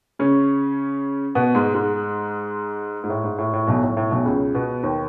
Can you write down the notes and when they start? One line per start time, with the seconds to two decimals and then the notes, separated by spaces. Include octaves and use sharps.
0.19 C#3 C#4
1.35 B2 B3
1.55 G#2 G#3
1.74 G#2 G#3
3.04 G#2
3.10 A2
3.24 G#2
3.39 A2
3.53 A2
3.67 B1 B2
3.82 A2
3.97 A2
4.11 B1 B2
4.26 C#2 C#3
4.55 B2 B3
4.83 D#2 D#3